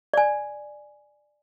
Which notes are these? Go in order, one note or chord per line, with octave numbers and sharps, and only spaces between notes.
D5 G#5